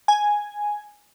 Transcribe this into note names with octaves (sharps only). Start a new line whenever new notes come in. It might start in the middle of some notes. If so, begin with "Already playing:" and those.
G#5